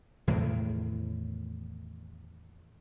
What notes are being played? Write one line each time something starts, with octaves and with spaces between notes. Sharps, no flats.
E2 A2 C3 D#3